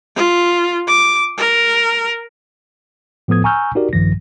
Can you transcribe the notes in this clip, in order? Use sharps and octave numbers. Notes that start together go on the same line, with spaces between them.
F4
D6
A#4
A2 F3 B3 A4 D#6 G#6
G#5 A#5 C#6 E6 F6 G6
D#4 F#4 G4 A#4 D5
A#1 G2 D#3 F3 A#6